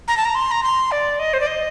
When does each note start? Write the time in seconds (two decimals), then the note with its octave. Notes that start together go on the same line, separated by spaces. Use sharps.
0.08 A#5
0.17 A5
0.25 A#5
0.35 C6
0.51 A#5
0.63 C6
0.91 D5
1.19 D#5
1.33 C5
1.40 D5
1.47 D#5